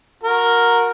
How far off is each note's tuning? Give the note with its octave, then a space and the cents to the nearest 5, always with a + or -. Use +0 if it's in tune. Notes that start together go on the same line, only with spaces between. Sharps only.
F#4 -25 A#4 +0